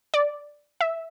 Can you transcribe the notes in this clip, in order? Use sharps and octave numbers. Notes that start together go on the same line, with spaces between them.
D5
E5